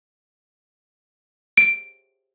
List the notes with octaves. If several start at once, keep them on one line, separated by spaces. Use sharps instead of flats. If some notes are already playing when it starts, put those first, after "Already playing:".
D7